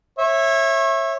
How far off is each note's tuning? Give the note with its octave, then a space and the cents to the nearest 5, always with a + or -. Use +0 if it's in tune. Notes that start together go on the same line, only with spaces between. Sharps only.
C#5 -30 E5 +0